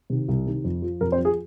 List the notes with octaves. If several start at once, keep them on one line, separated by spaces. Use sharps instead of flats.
C3 D#3
C2
C3 D#3
F2
F3
F2 A#4
C4 C5
F3
G#4